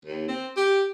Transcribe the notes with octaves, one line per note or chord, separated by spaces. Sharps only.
D#2
C4
G4